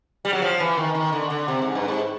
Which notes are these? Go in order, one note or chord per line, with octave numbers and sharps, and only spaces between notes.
G3
F#3
F3
E3
D#3
D#3
D3
D3
C3
G#2
G2
G#2